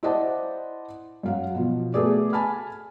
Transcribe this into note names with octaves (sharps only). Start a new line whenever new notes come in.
E4 C5 D5 D#5 F#5 A5
F#2 F5 F#5
B2 F3
A3 B3 G#4 D5
G#5 A5 B5 F6